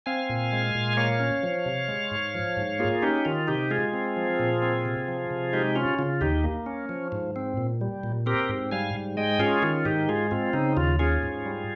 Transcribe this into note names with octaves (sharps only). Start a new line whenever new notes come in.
C4 F5 G#5
A#2
G#3
A#2
A#3 C#5 F5
C#4
F3
C3
G#3
G#2
F3
G#2
A#3 F4 G#4
C#4 D#4 G4
D#3 F4
C3 D#4 G4
G#3 F4 G#4
C4
F3
A#2
C4
C3
F3
C3
G#3 D#4 G4
C#4 F4
C#3 F4
D#2 D#4 G4
A#3
C#4
F3
G#2
C4
A#2
G3
A#2
C4 G4 A#4
G#2
G3 F5 G#5
G#2
G#3 D#5 G5
C#4 F4 G#4
D#3 F4
G#2 D#4 G4
G#3 F4 G#4
C4 F4
C#3 D#4
D#2 F4
C#4 F4 G#4
G#2
G3